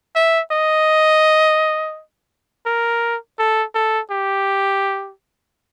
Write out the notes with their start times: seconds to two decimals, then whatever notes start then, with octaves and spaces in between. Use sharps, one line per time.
0.15 E5
0.51 D#5
2.66 A#4
3.39 A4
3.75 A4
4.11 G4